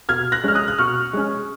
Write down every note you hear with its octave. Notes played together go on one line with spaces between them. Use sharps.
B2 F6 G#6
F#6 A#6
G#3 C#4 F6
D#6 F#6
F#6
B2 C#6 F6
G#3 C#4